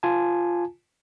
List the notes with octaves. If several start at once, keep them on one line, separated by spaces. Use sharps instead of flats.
F4 G#5 A5